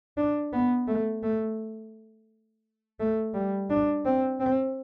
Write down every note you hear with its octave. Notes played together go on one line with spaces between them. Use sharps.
D4
B3
A3
A3
A3
G3
D4
C4
C4